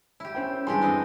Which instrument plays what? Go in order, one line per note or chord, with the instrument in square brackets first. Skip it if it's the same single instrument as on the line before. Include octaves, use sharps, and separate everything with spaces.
[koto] E4 G4
[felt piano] C#4 C5 G5
[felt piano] G2 E3 C6 [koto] G#3 D4 G4
[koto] B3 C4 D#5